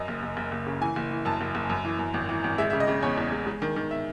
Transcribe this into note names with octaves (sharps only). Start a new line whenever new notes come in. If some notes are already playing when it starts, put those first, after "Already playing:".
Already playing: F#2 D#5
F#1
F#1
F#1
F#1
C#3
E3 G#5
F#1
E3
F#2 A5
F#1
F#1
F#2
E3
F#2
G#1
E3
G#1
G#3 E5
C#3 E5
D#5
C#3
E2 C#5
E2
G#3
G#3
D#3
D#3
E5